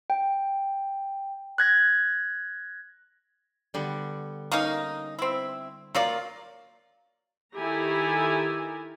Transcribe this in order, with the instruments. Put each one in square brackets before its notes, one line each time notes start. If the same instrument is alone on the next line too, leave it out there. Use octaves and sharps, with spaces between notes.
[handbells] G5
F#6 G#6 A#6
[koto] D3 G3 B3
[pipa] A#3 C#4 D#4
C4 E4
[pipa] F#3 A#3 D5 [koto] F4
[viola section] D#3 E4 G4 A4 G#5 A#5